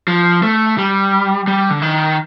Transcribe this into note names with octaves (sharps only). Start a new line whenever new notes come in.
F3
A3
G3
G3
D3
D#3